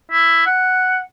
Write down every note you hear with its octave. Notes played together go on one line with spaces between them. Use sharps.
E4
F#5